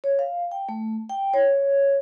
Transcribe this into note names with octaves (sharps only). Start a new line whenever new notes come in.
C#5
F5
G5
A3
G5
C#5